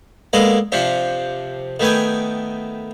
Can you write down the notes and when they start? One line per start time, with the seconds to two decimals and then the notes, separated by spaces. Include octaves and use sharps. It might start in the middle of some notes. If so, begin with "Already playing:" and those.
0.33 G#3 A#3 B3 A4 D5 D#5
0.72 C3 F3 D4 G4
1.80 D#3 A3 B3 G5 G#5